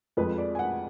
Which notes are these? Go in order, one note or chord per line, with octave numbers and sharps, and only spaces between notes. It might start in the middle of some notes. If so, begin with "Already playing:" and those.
F2 F3 G#3 B4
D5
G#5
F#5